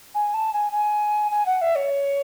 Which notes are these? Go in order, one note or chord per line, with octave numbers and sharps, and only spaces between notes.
G#5
A5
G#5
G#5
G#5
F#5
E5
C#5